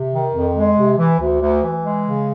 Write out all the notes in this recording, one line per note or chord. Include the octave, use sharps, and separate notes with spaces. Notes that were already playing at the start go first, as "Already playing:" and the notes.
Already playing: C3
D#3
F2
G#3
C3
E3
D2
D2
E3
G#3
C#3